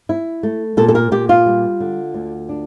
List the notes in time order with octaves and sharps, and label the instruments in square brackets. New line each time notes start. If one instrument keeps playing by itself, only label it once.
[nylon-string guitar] E4
A3
A#2 A4
A4
A#4
A#2 G4
F4
G3
D3
D2
D4